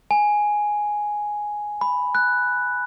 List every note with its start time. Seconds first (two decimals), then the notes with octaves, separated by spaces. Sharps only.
0.11 G#5
1.81 B5
2.15 F#6